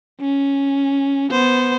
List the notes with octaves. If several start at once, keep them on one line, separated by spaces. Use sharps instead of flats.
C#4
B3 C5